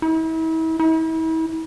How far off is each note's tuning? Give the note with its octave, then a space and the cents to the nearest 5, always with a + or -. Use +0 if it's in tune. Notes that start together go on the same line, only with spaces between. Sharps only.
E4 -40
E4 -40